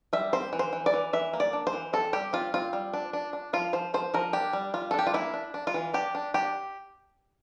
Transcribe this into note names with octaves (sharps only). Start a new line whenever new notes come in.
G3 E5
C4 C5
E3
C5
E3
D5
E3
E3 E5
A#3
D5
D4
C5
E3
C4 A4
G3 G4
C4 F4
C4 F4
G3
D4
D4
D4
F3 F4
F3 C5
F3 C5
F3 A#4
D4 G4
G3
G3 F4
A4
D4
G4
F4
A#3 E4
D4
D4
F4
E3
D4 G4
D4
D4 G4